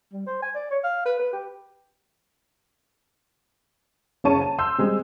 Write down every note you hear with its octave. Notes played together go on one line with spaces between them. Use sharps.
G3
C5
G#5
D5
C#5
F5
B4
B4
G4
F#1 C#3 C#5 A5 C#6 D#7
A5
C6 E6 G6
G3 G#3 C4